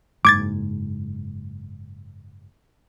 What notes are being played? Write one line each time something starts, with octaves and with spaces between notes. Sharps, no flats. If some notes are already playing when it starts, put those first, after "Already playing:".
F#1 G#2 D6 G#6 A6